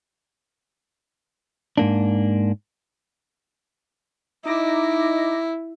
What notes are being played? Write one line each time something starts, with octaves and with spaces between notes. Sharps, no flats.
G#2 A#3 D4
D#4 E4 D6 A#6